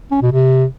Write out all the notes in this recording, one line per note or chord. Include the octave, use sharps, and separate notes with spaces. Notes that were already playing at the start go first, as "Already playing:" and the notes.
C#4
B2
C3